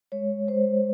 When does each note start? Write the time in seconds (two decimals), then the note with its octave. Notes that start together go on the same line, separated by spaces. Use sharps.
0.12 G#3 C#5
0.47 G#3 C5